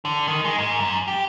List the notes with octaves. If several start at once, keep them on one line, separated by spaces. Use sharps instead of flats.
D3
D#3
G#3
G#2
F#2
G4